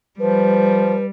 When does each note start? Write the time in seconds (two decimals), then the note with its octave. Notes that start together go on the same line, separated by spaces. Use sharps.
0.20 F3 G3 B4